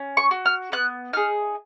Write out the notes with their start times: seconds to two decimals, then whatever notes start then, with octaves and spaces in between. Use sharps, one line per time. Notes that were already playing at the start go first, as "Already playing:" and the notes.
Already playing: C#4
0.17 C#6
0.31 F#4
0.46 F6
0.72 B3 F#6
1.13 D#4 G#4 F6